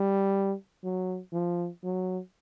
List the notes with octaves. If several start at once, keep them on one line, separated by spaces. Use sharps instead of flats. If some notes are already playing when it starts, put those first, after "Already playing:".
Already playing: G3
F#3
F3
F#3